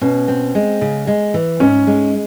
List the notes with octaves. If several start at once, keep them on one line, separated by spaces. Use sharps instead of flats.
B2 C#4
C4
G#3
C#3
G#3
E3
G#2 C#4
G#3